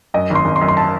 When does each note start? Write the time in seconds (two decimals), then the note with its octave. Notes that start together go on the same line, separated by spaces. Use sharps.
0.14 F#2 D#5
0.30 G#1 C6
0.45 G#1
0.56 C6
0.61 F#2
0.68 C6
0.77 A5